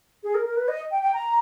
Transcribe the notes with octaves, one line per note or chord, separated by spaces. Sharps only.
G#4
A#4
A#4
B4
D#5
G5
G5
A#5